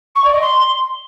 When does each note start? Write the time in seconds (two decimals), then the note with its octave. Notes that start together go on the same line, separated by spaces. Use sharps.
0.15 C#6
0.24 D5
0.32 D#5
0.41 C6